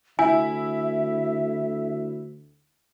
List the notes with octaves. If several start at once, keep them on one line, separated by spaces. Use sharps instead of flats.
D2 E4 E5 G#5